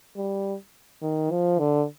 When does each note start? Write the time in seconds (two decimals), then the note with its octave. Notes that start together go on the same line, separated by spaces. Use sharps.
0.17 G3
1.02 D#3
1.31 F3
1.59 D3